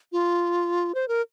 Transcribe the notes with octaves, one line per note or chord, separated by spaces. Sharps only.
F4
C5
A#4